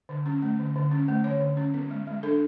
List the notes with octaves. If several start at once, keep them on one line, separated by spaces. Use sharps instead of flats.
D3
C#4
A3
D3
D3
C#4
A3
D3 C#5
D3
C#4
B3
G#3
G#3
D4 A4